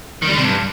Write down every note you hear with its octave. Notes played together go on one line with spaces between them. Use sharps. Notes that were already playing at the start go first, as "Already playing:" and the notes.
D#3
G3
D3
C3
G2